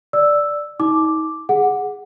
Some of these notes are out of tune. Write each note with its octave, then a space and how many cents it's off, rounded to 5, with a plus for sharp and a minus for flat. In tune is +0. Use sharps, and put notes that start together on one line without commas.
D5 +0 E6 +0
D#4 +35 D6 +0
G#4 +0 F#5 -10